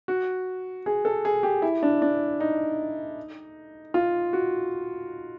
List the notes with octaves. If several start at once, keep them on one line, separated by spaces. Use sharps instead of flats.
F#4
G#4
A4
G#4
G4
E4
D4
D4
D#4
F4
F#4